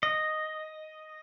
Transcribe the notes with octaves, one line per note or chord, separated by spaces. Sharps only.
D#5